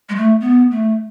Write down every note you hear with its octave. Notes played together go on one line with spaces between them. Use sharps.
G#3
A3
B3
A3